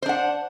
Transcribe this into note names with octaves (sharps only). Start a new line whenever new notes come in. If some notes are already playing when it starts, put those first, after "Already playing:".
D4 C5 F#5